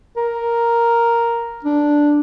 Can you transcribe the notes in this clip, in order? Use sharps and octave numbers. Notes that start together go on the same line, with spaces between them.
A#4
D4